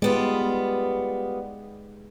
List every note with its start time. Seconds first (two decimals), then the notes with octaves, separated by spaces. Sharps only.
0.02 G3 G#3 B3 F4